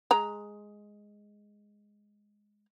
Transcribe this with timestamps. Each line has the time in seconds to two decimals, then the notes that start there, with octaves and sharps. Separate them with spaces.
0.11 G#3 A#5